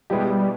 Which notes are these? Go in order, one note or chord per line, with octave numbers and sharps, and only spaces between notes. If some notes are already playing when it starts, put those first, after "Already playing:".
B2 G3 G#3 B3 E4 G4